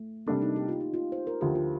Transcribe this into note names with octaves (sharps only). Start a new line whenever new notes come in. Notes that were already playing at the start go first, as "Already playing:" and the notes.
Already playing: A3
C3 G3 A#3 D4 A4
D#4
G4
F4
D#4
F4
C5
A#4
D2 D3 F3 G4
F4